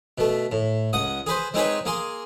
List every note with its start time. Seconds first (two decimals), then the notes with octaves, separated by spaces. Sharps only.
0.18 B2 A3
0.52 A2
0.93 C#2 F#5 D#6
1.27 G#4 B4 C5
1.54 G#3 C4 D#4 G#4 B4 C#5
1.85 A#3 G#4 C6